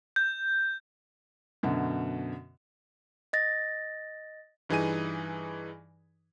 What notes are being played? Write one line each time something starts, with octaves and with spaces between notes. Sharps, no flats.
G6
F#2 B2 D3
D#5 A6 A#6
G2 E3 D#4 G#4 G#5 D#7